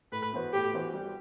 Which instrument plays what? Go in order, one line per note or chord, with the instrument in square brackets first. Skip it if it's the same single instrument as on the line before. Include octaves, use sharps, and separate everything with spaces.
[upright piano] A2 [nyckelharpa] B4
[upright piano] E3 B3 F#4 C5
[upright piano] A2 [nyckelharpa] G4
[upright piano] E3 B3 F#4 C5
G3